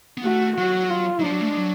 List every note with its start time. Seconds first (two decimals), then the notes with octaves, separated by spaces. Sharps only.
0.17 B3
0.24 A3 F#4
0.57 F#3 F#4
0.90 F4
1.19 F#3
1.23 F3 D4
1.32 F#3
1.41 A3
1.48 G#3
1.57 F#3